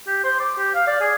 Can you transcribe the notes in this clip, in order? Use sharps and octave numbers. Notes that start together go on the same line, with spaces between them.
G4
C5
D6
G4
F5
D5
G#4